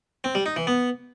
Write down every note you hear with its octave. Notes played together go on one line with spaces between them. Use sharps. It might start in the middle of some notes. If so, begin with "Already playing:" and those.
C4
G3
D#4
E3
B3